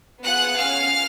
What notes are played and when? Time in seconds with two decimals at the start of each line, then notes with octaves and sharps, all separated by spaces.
0.24 B3 F4 G#4 F#5 F#6
0.59 C#4 G#4 F5 F6